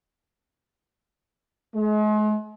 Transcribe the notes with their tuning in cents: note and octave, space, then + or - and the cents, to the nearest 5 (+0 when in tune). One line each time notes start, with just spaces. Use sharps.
G#3 +40